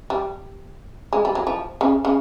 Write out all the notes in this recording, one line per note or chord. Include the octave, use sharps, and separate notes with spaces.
G3
G#3
G3
F#3
F3
C#3
C#3